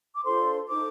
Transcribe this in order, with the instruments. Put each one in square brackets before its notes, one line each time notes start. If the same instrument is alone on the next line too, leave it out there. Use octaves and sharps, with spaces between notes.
[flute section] D6
D4 F4 A4 C5 C6
D#4 A4 C5 D6